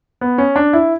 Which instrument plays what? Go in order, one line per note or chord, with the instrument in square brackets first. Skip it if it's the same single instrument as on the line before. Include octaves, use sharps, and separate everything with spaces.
[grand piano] B3
C#4
D4
E4